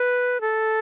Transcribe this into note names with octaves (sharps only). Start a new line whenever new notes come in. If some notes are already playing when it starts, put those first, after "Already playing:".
Already playing: B4
A4